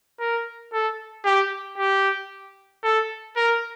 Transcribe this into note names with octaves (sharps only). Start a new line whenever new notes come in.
A#4
A4
G4
G4
A4
A#4